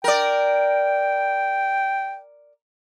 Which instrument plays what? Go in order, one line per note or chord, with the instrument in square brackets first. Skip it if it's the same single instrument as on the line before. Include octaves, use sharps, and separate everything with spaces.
[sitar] A#4 D5 [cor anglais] G5